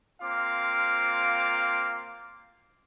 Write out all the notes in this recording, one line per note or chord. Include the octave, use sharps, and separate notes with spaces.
A#3 C4 F4 F5 D6